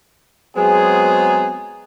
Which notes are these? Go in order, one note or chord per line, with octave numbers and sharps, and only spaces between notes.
F#3 G#3 B3 C4 G#4